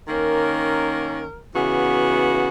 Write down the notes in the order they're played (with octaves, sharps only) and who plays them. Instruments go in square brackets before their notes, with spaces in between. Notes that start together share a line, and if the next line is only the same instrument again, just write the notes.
[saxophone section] D#3 A#3 C#4 A#4
C#3 E3 B3 F#4